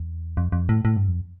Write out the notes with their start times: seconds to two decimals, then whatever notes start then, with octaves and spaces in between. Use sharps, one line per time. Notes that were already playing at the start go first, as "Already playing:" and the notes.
Already playing: E2
0.37 F2
0.52 F2
0.69 A2
0.85 A2
0.97 G2
1.08 F2